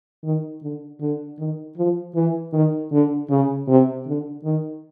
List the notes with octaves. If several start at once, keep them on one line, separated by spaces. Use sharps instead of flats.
D#3
D3
D3
D#3
F3
E3
D#3
D3
C#3
C3
D3
D#3